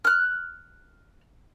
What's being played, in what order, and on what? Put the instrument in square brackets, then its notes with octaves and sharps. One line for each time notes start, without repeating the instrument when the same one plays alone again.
[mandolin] F6 F#6